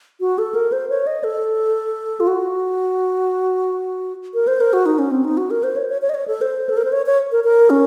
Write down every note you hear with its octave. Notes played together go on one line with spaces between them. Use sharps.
F#4
A4
A#4
C5
C#5
D#5
A4
F4
F#4
A#4
C5
A#4
F#4
D#4
C#4
C4
D#4
F#4
A#4
C5
C#5
C#5
C#5
D#5
C#5
A4
C5
A4
A#4
C5
C#5
C#5
A#4
A#4
C#4